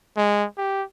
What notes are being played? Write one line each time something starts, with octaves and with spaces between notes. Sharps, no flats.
G#3
G4